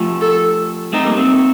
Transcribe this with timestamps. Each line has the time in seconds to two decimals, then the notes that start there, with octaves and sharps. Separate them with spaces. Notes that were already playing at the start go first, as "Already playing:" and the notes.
Already playing: F3 A3
0.21 A4
0.93 A3 C4 D#4
1.06 G3 A#3
1.17 A3 C4